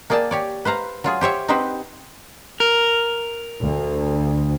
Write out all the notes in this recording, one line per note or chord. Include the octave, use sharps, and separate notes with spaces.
A#3 G#4 D5 G5 A5
G4 C#5 D5
B4 C5 F5 A#5
F#3 F4 G#4
G4 C5 C#5 E5
C4 D#4 F#4 G4 B4 C5
A#4
D2